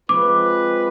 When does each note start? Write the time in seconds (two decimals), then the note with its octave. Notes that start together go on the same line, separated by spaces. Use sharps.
0.09 F3 G#3 C4 F4 B4 D6